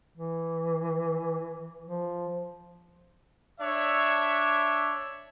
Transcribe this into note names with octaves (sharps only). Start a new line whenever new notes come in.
E3
F3
D4 C#5 E5